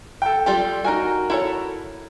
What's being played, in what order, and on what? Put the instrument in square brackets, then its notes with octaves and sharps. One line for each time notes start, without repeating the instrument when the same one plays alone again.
[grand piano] A4 G5
[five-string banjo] G3 F4 G4
[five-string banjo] D#4 G#5 [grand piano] F#4 A#4
[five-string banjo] E4 A4 C#5